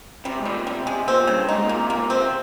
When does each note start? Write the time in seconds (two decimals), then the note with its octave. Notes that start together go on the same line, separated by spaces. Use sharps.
0.25 C3 G3
0.39 G#2
0.45 A#2 G3
0.67 C3 G3
0.86 C3 G#3
1.07 A#2 C4
1.27 G2 C#3
1.48 G#2 D#4
1.64 A#2
1.69 A#3
1.80 C3
1.90 A#3
1.95 A#2
2.10 C3 C4